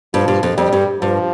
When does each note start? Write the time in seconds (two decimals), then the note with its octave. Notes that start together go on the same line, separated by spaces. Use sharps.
0.14 G2 F3
0.28 G2
0.43 F2
0.57 F2 G3
0.73 G2
1.02 G2 F3